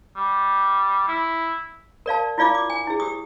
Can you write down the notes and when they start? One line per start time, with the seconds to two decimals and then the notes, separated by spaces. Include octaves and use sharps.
0.17 G3
1.08 E4
2.06 A#4 D5 F5 A5
2.38 E4 F4 D5 F5 D6
2.55 D6
2.70 G#5
2.87 E4 G#4
3.00 G4 D#6